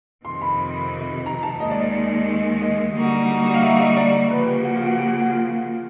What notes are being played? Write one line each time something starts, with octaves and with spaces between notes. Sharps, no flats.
F2 C3 D#3 C6
B5
A#5
A5
D#2 D#3 G#3 D#5
D5
D5
D#5
D3 G3 A#3 D#4 F#4
F5
E5
D#5
D5
C#3 F3 A#3 B4
G4
F#4
F4
F#4
G4
F#4
F#4
F4